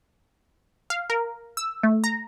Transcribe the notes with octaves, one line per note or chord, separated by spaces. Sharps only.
F5
A#4
E6
A3
A#5